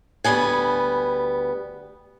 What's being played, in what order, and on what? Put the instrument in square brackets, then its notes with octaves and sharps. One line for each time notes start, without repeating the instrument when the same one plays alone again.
[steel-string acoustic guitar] D2 G2 G3 B3 G#5